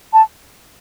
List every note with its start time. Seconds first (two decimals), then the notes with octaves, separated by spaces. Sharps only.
0.13 A5